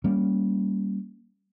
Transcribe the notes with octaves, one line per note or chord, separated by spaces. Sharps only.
G3 A#3 C#4